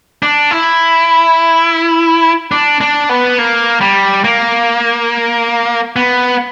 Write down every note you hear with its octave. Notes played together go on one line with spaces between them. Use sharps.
D4
E4
D4
D4
B3
A#3
G3
A#3
B3